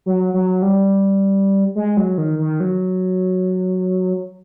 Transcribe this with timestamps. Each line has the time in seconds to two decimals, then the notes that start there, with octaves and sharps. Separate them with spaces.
0.06 F#3
0.34 F#3
0.62 G3
1.75 G#3
1.97 F#3
2.18 D#3
2.39 D#3
2.60 F#3